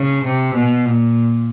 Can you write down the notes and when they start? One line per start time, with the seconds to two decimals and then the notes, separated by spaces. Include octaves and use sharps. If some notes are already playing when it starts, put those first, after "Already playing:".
Already playing: C#3
0.24 C3
0.55 B2
0.85 A#2